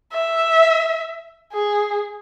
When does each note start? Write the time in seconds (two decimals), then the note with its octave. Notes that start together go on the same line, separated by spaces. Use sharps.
0.13 E5
1.53 G#4